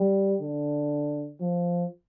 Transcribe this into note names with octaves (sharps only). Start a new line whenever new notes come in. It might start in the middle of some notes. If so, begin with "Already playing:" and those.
Already playing: G3
D3
F3